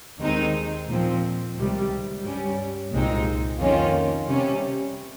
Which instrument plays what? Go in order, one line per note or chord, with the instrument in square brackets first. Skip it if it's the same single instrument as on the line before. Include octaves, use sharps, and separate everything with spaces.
[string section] D#2 D#3 G#3 C4 D#4
A#2 F3 C4
C#2 C3 D#3 G3
G2 G3 C#4
C2 A#2 G#3 C4 D#4
F2 D#3 A#3 C#4 F4
C3 G3 C#4